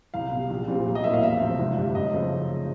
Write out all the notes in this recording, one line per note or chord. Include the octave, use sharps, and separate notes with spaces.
C2 F5
B2 G3
A#1
A#2 G3 C4
B1
D#5
A2 F#3 A#3 E5
F5
E2 E5
C3 F3 A3 C4
G#1
G2 D3 G3
F#2 D#5
C#3 F3 A3 C4